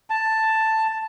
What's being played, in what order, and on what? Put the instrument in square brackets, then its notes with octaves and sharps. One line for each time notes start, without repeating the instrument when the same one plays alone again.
[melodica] A5